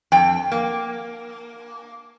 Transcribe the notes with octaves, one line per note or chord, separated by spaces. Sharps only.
F2 G5
A#3